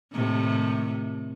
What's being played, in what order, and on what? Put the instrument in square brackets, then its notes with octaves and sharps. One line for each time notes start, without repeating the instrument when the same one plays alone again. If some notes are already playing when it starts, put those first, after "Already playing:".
[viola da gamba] A2 C3 D#3